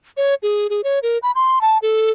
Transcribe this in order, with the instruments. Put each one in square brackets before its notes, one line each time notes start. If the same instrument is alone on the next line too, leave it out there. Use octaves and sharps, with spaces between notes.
[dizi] C#5
G#4
G#4
C#5
A#4
B5
C6
A5
A4